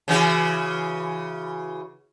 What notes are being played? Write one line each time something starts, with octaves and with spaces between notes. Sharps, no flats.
C#3 E3 F#4